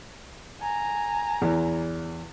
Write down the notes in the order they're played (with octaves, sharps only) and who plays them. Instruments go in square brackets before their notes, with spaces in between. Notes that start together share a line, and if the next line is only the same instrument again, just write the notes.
[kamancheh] G#5 A#5
[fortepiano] E2